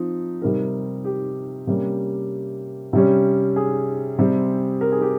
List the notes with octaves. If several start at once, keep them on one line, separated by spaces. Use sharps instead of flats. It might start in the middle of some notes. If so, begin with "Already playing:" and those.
Already playing: F3 C4 D#4
C3 G3 C4 D#4 A#4
G4
C3 G3 A#3 C#4
C3 G3 C#4
G#4
C3 G3 C4
A#4
G#4
G4